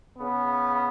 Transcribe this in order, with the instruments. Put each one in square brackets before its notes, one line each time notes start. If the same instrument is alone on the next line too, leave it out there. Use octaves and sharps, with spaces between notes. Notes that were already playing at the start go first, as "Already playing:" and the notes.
[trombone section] C#3 B3